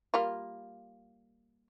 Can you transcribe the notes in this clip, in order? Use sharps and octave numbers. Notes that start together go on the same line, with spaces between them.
G3 A#3 F4